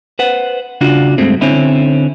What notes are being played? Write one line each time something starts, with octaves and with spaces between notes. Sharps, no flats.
B4 C5 F#5
C#3 D4 F4 F#4
G2 G#3 A3 C4
D3 C4 C#4 E4